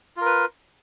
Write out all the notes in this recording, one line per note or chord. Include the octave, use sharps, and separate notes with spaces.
F4 A#4 B4